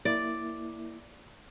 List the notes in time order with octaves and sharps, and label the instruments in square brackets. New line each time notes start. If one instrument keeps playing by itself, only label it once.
[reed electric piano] A#3 E4 [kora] D5